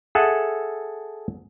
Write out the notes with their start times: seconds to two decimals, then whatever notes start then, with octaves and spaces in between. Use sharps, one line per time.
0.15 G#4 A4 E5 F#5 A5